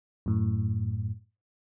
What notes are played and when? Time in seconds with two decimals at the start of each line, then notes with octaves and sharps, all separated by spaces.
0.26 F#2 A2